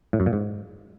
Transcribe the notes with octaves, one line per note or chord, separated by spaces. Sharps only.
A2
F#2
A#2
G#2